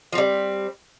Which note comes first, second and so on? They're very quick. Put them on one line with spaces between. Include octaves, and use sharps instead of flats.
F3 C4 G3